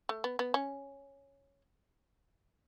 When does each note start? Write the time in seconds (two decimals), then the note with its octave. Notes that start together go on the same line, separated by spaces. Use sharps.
0.09 A3
0.24 B3
0.39 B3
0.54 C#4